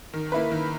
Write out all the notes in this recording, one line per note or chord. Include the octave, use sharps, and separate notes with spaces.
D#3
A#3 E4 B4
D#3